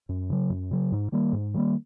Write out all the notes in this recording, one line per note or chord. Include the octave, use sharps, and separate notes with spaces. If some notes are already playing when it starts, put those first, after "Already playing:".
F#2
C#3 F#3
F#2
C#3 F#3
G#2
D#3 G3 A#3
G#2
D#3 G3 A#3